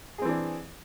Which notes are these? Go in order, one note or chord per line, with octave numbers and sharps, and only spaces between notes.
E3 C4 D4 G#4